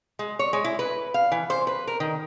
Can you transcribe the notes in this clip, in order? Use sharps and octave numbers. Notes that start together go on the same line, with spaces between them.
G#3
C#5
G#3
E4
B4
F5
E3
C5
B4
A#4
D#3